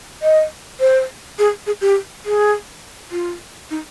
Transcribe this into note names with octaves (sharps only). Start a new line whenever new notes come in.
D#5
C5
G#4
G#4
G4
G#4
F4
D#4